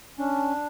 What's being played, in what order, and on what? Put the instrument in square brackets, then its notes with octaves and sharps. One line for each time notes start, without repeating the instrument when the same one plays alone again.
[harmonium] C#4 D4